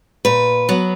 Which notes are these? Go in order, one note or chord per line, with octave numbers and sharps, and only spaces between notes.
A#2 B4
F#3 B3